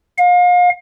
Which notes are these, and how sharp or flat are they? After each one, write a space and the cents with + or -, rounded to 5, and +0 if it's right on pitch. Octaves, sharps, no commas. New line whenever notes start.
F5 +35